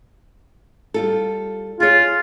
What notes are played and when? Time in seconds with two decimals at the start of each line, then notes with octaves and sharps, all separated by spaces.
0.94 G3 F4 A4
1.80 F4 G#4 C#5